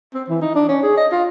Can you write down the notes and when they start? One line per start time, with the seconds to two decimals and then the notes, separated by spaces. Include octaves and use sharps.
0.14 C4
0.29 E3
0.42 D#4
0.55 D4
0.68 C#4
0.83 G#4
0.98 D#5
1.12 F4